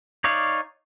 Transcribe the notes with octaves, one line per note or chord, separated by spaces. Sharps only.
D#4 C#5 D5 F5